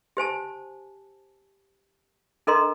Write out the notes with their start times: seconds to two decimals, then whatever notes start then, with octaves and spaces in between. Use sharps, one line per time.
0.17 G4 C5 G#5 A5
2.47 D4 A4 A#4 D#5 A#5 C6